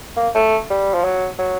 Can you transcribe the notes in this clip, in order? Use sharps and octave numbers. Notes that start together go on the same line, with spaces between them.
A#3
A3
G3
F3
F#3
F#3